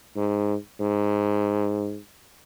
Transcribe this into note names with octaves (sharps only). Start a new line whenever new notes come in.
G#2
G#2